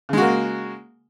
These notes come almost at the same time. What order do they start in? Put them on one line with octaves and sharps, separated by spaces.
C#3 G#3 F#4 A#3